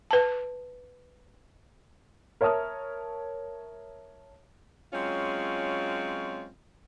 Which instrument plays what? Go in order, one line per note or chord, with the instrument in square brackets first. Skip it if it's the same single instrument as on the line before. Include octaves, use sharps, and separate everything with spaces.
[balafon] B4 A5
[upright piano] A#4 C#5 E5 A5 D#6 F6
[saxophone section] F#3 G#3 C4 C#4 F4